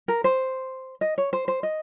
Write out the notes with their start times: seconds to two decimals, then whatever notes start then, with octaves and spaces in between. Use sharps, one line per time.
0.08 A#4
0.24 C5
1.01 D#5
1.18 C#5
1.33 C5
1.48 C5
1.63 D#5